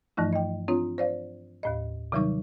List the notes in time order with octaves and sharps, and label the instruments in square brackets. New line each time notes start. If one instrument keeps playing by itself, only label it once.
[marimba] G2 E3 F3 A3 D#4
D#5 G5
C4 D4 F4 C#5
C5 D5 F5
D#2 A2 D#5
C3 D#3 F#3 G3 D#4 D6